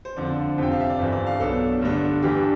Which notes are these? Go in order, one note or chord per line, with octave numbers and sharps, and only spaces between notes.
C5
F2 D3 F3 C4 D5
F2 C3 F3 G5
F5
E5
D5
G1 G2 E3 C5
D5
F5
B1 B2 B3 D4 A4
G2 D3 A3 D4
G2 E3 G3 D4 G4